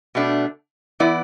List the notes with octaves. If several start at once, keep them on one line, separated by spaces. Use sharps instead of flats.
B2 A3 D4
E3 B3 E4 D5